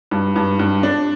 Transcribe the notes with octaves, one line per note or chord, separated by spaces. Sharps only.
G2
G2
G2
D4